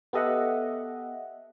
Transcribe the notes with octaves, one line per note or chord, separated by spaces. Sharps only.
B3 G4 A4 D#5 E5 F#5